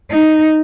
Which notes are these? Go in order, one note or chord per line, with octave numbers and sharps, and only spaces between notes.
D#4